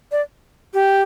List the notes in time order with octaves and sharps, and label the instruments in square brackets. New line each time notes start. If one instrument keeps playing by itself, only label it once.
[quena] D5
G4